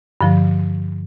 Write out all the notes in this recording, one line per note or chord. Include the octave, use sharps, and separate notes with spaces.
G2 D3 F3